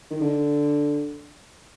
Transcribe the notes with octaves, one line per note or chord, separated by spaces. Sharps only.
D#3
D3